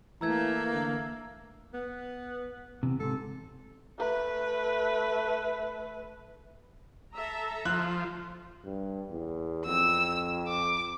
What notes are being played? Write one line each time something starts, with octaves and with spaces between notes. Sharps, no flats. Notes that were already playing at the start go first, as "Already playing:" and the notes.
E3 A3 A#3 A#5 E6 G#6
D3
B3
E2 C3
G#2 C3 A4
A3 B4
A4 E5 A#5
F3 F#6
G2
E2
F2 E6
D6